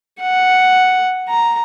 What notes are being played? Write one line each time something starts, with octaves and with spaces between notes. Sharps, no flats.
F#5
A#5